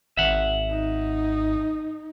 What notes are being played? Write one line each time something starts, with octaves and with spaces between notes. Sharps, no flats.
G#1 E5 F#5
D#4